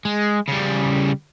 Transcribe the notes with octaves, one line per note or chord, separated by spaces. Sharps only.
G#3
C#3 G3